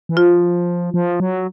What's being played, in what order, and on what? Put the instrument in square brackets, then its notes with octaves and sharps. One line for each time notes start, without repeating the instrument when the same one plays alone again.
[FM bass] E3
[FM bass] F3 [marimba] F4
[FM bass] F3
F#3